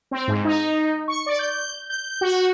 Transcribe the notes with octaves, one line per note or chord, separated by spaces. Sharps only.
C4
G#2
D#4
C#6
D5
G6
G6
F#4